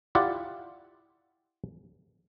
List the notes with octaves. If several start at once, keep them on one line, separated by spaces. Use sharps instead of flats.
E4 F4 G4 D5 F#5